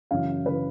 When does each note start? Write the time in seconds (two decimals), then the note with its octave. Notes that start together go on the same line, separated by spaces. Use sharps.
0.11 F#2 C#3 E3 F5
0.46 C#3 E3 B4